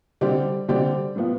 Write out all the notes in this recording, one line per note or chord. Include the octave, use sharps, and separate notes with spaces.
D3 G3 C4 G4 D5
D3 G3 C4 G4 D5
A2 F3 B3 F4